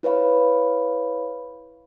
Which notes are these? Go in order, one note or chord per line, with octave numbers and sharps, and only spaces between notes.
E4 B4 C#5 F5 B5